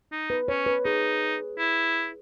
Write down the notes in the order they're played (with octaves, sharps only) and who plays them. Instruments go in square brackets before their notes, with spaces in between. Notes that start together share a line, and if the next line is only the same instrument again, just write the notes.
[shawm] D#4
[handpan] B4
[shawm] C#4 [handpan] C#5
[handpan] B4
[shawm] D#4 [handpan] G#4
[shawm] E4